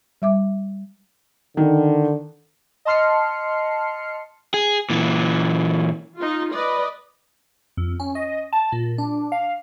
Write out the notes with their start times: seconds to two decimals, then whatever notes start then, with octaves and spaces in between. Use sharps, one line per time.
0.22 G3 E5 D6
1.57 D3 D#3
2.85 D#5 A5 C6 F6 C7 C#7
4.54 G#4
4.90 A#2 E3
6.17 D#4 F4
6.53 B4 D5 D#5
7.77 F2
8.00 C#4
8.15 D#5
8.53 A5
8.72 A#2
8.98 D4
9.32 F5